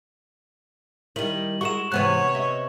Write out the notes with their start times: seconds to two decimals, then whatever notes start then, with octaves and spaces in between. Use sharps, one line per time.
1.16 D#3 G3 E4 F#7
1.61 G#3 E4 F#4 A#4 C#6 E7
1.92 G#2 C3 E3 B3 B4 C#5 F#6
2.35 D#5 E5